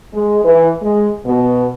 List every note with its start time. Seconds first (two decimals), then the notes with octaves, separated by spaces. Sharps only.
0.13 G#3
0.44 E3
0.82 G#3
1.26 B2